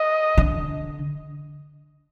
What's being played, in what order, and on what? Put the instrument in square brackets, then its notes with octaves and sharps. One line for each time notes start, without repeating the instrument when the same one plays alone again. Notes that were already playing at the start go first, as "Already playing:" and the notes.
Already playing: [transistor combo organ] D#5
[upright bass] D3